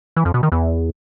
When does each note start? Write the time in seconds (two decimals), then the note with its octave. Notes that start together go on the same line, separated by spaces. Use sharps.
0.16 E3
0.25 F2
0.34 B2
0.43 D#3
0.52 E2